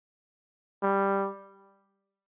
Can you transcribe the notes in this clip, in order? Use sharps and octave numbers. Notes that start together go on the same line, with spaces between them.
G3